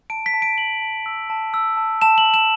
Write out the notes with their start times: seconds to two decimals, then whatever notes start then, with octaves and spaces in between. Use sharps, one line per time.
0.10 A5 D7
0.26 B6
0.34 A5
0.42 D7
0.58 A5 F#7
0.82 A5
1.06 E6
1.30 A5
1.54 E6
1.77 A5
2.02 A5 E7
2.18 F#7
2.26 A5
2.34 E7